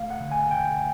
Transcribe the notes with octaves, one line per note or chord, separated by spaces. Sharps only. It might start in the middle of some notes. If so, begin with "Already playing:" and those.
Already playing: A3 F5
F#5
D3
G#5
D2 G5